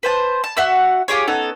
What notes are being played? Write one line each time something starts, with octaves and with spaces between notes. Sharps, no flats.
B4 C5 A5
A5
F#4 E5 F#5 E6
F4 G4 G#4 C#5
B3 C#4 D#4 A4